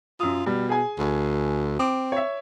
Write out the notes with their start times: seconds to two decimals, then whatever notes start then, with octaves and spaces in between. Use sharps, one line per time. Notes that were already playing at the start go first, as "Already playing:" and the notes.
0.20 F#2 F4 D#6
0.46 B2 G3
0.69 G#4 G#5
0.99 D2
1.79 C4 D6
2.12 C#5 E5